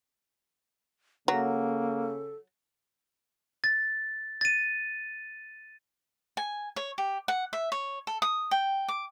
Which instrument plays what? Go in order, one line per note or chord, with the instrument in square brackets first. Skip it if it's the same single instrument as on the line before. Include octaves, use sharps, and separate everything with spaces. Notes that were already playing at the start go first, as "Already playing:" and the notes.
[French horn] C#3 [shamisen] F#3 [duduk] A#3 [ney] A4
[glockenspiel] A6
A6 D#7
[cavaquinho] G#5
C#5
G4
F#5
E5
C#5
A4
D#6
G5
D6